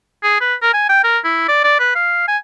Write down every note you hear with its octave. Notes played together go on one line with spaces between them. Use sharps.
G#4
B4
A#4
G#5
G5
A#4
E4
D5
D5
B4
F5
G#5